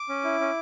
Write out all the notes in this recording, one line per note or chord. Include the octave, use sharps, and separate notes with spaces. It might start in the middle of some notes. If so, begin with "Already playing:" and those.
Already playing: D6
C#4
E4
C#4